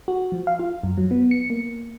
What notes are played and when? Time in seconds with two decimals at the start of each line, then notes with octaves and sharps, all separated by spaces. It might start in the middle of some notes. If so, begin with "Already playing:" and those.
0.08 F#4
0.32 F3
0.47 F5
0.59 F4
0.83 F#2
0.97 F#3
1.11 B3
1.31 C#7
1.50 A#3